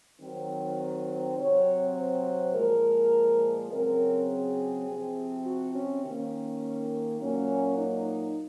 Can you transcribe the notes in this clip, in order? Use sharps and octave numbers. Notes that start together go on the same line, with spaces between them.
D#3 F#3 C4
C3 F#3 C4 C#5
C5
A#2 F3 G#3 A#4
C#3 F#3 C4 A#4
G#4
C3 F3 C4
F#4
C#4
D#3 A#3 C#4
A#2 F#3 A#3 C#4
D#4